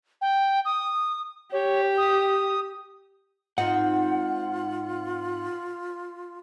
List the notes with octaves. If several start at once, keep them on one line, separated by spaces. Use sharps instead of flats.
G5
D#6
G4 C#5
D#6
G#2 C4 D#4 F4 F#5